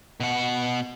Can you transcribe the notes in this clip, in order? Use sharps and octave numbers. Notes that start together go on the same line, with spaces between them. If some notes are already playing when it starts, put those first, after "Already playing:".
B2 F#5